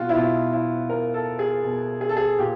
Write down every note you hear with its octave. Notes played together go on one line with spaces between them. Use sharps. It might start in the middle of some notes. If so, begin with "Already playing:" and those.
Already playing: B2 F4 F#4
E4
B2 F4
E4
B2 A#4
A4
G#4
B2
G#4
A4
G#4
A#2 G4